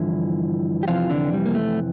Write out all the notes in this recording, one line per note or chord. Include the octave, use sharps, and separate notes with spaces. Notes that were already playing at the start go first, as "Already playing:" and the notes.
Already playing: G2 D3 E3 F3 E4
G4
F2 C3 E3 F3 F4
D3 D4
G3
A#3
A3